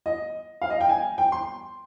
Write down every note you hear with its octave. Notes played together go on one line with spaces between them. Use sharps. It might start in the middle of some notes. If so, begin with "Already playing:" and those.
D#5
F5
D#5
G5
G#5
G5
C6